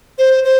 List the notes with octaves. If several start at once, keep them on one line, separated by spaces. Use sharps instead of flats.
C5
C5